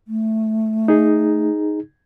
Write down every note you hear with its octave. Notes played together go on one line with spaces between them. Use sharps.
A3
D#4 G#4